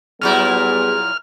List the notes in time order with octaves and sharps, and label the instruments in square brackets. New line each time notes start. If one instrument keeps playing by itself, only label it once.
[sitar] A#2 F#3 E4 [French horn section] G3 B3 G#4 [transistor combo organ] F6